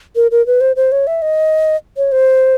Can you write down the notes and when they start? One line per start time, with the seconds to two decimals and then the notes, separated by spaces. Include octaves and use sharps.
0.16 A#4
0.31 A#4
0.47 B4
0.61 C5
0.76 C5
0.92 C#5
1.07 E5
1.22 D#5
1.97 C#5
2.12 C5